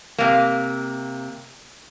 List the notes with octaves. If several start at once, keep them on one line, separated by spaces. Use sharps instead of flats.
C3 A#3